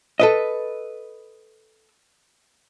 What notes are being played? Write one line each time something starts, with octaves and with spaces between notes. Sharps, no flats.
A4 B4 D#5